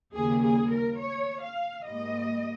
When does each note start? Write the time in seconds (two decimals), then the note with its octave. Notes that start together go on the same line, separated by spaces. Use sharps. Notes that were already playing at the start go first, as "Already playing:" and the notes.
0.13 D#2 C#3 G3 A#3 G#4
0.43 G#4
0.70 A#4
0.99 C#5
1.42 F5
1.85 G#2 G3 A#3 D#5